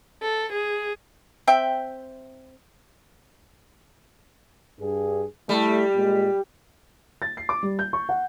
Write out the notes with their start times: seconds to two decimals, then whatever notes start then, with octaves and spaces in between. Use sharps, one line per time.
0.22 A4
0.52 G#4
1.47 C4 E5 G5
4.79 G2 G#4
5.49 G3 A3 E4
5.94 A#2 G#3
7.22 A6
7.37 C7
7.49 D6
7.63 G3
7.79 G6
7.93 C#6
8.09 F#5